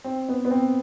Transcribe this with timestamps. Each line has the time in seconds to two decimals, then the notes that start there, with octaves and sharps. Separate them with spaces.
0.04 C4
0.28 B3
0.45 B3
0.51 C4